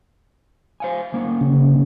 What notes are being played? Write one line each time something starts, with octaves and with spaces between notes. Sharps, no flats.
C5 F5 G#5
D2 A#3 C#4
C#3